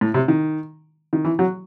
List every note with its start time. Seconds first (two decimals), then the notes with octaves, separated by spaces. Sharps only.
0.01 A2
0.14 C3
0.28 D#3
1.13 D#3
1.25 E3
1.39 F#3